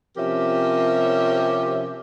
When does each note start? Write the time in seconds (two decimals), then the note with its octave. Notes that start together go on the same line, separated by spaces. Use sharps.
0.17 C3 F3 C#4 G4 A#4 E5